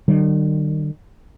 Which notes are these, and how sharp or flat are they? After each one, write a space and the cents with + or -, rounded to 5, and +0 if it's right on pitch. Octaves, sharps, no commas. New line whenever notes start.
D#3 -45 G3 -40